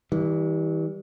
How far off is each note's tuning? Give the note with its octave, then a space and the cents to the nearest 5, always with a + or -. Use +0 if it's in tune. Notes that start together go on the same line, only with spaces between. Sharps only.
E3 -40 G3 +0